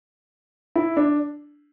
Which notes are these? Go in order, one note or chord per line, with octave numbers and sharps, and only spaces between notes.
E4
D4